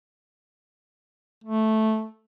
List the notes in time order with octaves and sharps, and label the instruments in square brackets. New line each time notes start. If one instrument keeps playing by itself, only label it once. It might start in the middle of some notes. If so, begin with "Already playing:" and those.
[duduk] A3